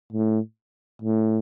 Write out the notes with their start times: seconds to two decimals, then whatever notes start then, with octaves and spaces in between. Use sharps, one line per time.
0.12 A2
1.02 A2